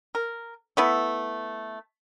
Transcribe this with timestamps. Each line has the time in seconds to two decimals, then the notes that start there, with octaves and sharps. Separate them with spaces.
0.15 A#4
0.77 A3 B3 E4